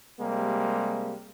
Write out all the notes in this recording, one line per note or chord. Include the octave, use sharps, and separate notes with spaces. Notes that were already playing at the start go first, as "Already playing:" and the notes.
C3 G3 G#3 A#3